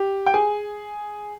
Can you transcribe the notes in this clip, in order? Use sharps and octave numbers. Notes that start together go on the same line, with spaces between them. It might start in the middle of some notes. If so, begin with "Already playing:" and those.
Already playing: G4
G5
G#4 G#5